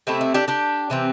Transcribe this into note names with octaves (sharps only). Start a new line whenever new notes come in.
C3 A3 C4 E4
E4
D4 G4
D4 G4
C3 E3 C4